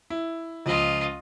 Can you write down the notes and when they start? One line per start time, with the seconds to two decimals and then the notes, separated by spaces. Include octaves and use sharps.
0.10 E4
0.66 C#2 F3 F4 D#5